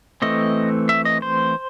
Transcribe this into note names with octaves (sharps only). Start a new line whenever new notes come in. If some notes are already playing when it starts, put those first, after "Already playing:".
E3 A3 C4 D#5
E5
D#5
C5